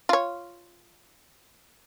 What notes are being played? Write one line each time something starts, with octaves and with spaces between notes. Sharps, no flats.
F4 C#5